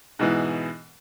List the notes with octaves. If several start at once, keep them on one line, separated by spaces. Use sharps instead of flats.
G#2 B2 E3